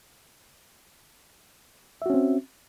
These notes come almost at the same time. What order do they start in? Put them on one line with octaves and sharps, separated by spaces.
E5 F#4 C#4 C4